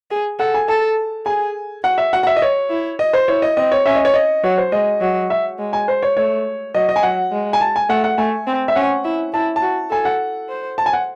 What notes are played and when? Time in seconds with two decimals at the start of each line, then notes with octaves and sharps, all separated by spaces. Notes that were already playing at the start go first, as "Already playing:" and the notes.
0.11 G#4
0.39 A4 F#5
0.54 G#5
0.68 A4 A5
1.26 G#4 G#5
1.83 F#4 F#5
1.98 E5
2.13 F#4 F#5
2.23 F#5
2.27 E5
2.36 D#5
2.42 C#5
2.70 E4
2.99 D#5
3.13 C5
3.28 E4 C#5
3.42 D#5
3.57 C4 D#5
3.72 C#5
3.86 C#4 E5
3.95 D#5
4.05 C#5
4.14 D#5
4.43 F#3 C#5
4.58 C5
4.72 G#3 D#5
5.01 F#3
5.30 E5
5.59 G#3
5.73 G#5
5.88 C5
6.03 C#5
6.17 A3 C#5
6.74 F#3 D#5
6.89 D#5
6.96 G#5
7.03 F#3 F#5
7.32 G#3
7.53 G#5
7.61 A5
7.76 G#5
7.89 A3 F#5
8.04 F#5
8.18 A3 G#5
8.47 C4
8.68 E5
8.76 C#4 F#5
9.04 E4
9.34 E4 A5
9.56 A5
9.62 F#4
9.91 A4 G#5
10.05 F#5
10.49 C5
10.78 A5
10.86 G#5
10.93 F#5